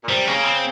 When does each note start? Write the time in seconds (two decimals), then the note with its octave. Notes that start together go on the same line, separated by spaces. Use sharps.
0.03 A#2
0.09 C3 G3
0.26 C#3 A#3
0.45 C4